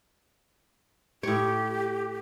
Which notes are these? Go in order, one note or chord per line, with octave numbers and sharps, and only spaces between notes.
A2 G4 C#5